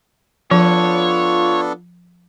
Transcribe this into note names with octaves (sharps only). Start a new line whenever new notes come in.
F3 B3 D4 F4 A4 C#5